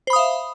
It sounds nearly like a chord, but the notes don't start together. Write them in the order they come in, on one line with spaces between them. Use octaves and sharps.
C5 B5 D#6 F5 E5